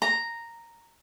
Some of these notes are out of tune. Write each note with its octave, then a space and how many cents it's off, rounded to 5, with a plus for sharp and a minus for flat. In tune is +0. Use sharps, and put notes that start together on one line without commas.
A#5 -5